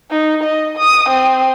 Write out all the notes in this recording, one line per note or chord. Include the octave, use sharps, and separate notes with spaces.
D#4
D#5
D#6
C4